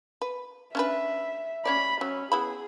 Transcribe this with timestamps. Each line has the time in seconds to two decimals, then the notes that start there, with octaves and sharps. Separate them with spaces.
0.22 B4
0.75 C#4 D4 B4 E5
1.65 C#4 C#5 D5 B5
2.01 F#3 C#4
2.32 B3 E4 G#4 B5